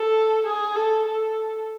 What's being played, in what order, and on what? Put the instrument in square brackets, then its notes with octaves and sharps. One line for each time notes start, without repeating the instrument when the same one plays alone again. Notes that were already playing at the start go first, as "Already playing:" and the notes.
Already playing: [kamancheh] A4
G#4
A4
A4